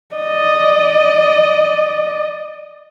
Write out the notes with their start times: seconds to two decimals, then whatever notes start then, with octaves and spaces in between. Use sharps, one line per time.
0.15 D5 D#5